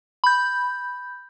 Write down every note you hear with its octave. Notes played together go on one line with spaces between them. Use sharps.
B5 G6